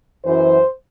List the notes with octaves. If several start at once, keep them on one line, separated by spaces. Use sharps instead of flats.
F#2 E3 C5